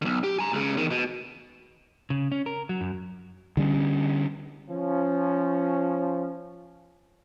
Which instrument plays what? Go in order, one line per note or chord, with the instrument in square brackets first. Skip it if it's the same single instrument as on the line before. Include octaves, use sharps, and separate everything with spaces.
[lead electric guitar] B1 D3
G4
G#5 A#5
C#2 C#3
E2 D#3
B2
C#3
C#4
A#4
F#3
F#2
[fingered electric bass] D3 G3 C#4
[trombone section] F3 C#4